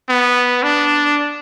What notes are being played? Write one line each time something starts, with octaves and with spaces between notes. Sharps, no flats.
B3
D4